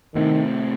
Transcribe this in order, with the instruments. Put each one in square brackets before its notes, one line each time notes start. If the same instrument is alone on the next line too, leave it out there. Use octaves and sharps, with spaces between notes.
[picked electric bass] A2 C3 [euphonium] D#3